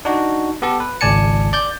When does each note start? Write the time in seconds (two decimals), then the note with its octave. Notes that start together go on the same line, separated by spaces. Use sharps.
0.05 D4 D#4 F#4
0.62 B3 G4 A4
0.80 B4
1.01 G#1 C#2 D5 G#5 A5 C#7
1.53 D5 G6